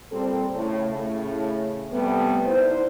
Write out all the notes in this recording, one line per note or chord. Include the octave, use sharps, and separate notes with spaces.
A#2 G3 C4 A4
A2 C#3
A2 C#3
C3 G3 A3 B3
D3 D#4 E4 C5